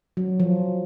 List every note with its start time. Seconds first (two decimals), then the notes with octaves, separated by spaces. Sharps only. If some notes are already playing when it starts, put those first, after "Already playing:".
0.17 F#3
0.40 F3